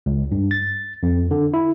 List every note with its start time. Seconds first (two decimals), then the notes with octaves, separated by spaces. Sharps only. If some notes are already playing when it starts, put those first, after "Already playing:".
0.06 C#2
0.32 G2
0.51 A6
1.03 F2
1.31 D3
1.54 E4